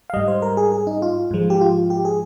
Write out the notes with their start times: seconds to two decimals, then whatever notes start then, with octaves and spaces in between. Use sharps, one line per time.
0.10 F5
0.14 G#2 G3 D#5
0.28 C5
0.42 A#4
0.57 G#4
0.72 G#4
0.87 D#4
1.02 F4
1.31 G#2 F3 G#3
1.50 G4
1.61 F4
1.90 G4
2.05 G#4